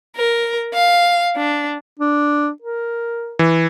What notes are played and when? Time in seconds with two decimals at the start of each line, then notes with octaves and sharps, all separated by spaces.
0.16 A#4
0.75 F5
1.37 D4
2.00 D4
2.62 A#4
3.39 E3